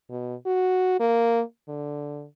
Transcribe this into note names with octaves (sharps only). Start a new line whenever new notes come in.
B2
F#4
A#3
D3